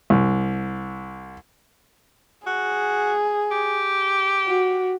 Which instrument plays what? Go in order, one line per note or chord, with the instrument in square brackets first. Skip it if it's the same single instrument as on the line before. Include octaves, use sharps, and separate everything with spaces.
[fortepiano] C2
[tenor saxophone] F#4 [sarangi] G#4
[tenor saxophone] G4
[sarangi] F#4